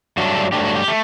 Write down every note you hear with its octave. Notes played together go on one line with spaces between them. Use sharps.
G2 F#3 A3 D4 F#4
A4
G2 F#3 A3 D4 G4
F#4
G4
A3